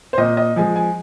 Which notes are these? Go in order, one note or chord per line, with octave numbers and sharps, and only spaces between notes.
C5
A#2 D#5
D#5
F3 G#3 G#5
G#5